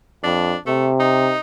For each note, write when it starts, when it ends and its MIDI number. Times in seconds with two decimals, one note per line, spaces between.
0.24 0.54 41
0.24 0.58 62
0.67 1.35 48
0.67 0.89 57
1.00 1.40 63